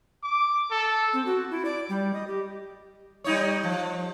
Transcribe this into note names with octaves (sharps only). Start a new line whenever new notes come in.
D6
A4
C4
F#4
E4
D5
G3
D#5
G4
G3 D#4 C#5
F3